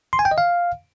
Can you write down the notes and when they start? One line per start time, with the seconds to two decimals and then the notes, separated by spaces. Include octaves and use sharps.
0.13 C6
0.19 G#5
0.25 G5
0.31 D#5
0.38 F5